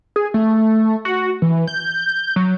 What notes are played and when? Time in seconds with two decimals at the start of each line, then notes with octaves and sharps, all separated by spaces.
0.16 G#4
0.34 A3
1.05 F#4
1.42 E3
1.68 G6
2.36 F#3